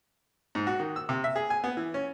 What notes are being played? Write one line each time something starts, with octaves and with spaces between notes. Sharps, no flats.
G#2
F#4
D#3
E6
C3
E5
G#4
G#5
B3
E3
C#4